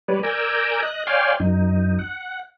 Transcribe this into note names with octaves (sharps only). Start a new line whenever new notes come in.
G3 B4 C#5 D5
A#4 D5 G#5 A#5 E6 G6
D#5 F#6
C#5 D5 F5 G5 G#5 C6
F#2 D#4
F#5